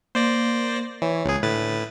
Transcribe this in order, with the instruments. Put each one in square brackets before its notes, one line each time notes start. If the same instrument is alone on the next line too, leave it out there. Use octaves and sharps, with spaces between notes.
[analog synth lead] A#3 [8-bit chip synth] C5 D5 A#6
[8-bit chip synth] E3 [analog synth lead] C#5
[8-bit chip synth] C#2 G#4
[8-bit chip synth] A2 B4 A6 [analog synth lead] D3